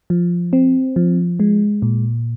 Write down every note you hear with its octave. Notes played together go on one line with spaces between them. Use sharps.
F3
C4
F3
G#3
A#2